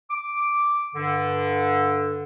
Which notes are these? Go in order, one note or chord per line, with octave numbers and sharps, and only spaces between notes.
D6
G2 D3